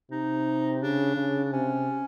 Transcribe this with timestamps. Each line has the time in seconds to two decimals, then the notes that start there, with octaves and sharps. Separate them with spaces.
0.10 C3 D#4
0.82 C#3 D4
1.17 C#3
1.45 D4
1.52 C3 C#4